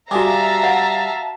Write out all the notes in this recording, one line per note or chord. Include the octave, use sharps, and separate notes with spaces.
G3 F#4 G#4 E5 F5 A5 A#5 D6
F#5